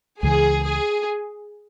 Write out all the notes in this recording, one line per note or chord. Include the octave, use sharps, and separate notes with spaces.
C#2 C#3 E3 G#4
G#4